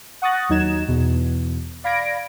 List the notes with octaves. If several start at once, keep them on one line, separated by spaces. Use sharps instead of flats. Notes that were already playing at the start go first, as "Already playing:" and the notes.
F#5 C#6 D#6 F#6 A6 A#6
D#2 F#3 D#4 G#6 E7
E2 B2
D5 F5 B5 G#6 A#6 D7